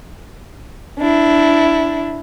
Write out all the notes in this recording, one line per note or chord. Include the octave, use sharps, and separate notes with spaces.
D4 E4